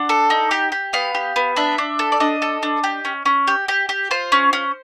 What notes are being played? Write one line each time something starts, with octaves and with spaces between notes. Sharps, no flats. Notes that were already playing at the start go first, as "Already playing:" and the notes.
Already playing: D4 F#5
A4
D#4
G4
G4
B3 F5
G4
B3
D4 E5
D4
A4
D5
D4 D#5
A4
D4
G4
C#4
C#4
G4
G4
G4
F4 C5
C#4
C#4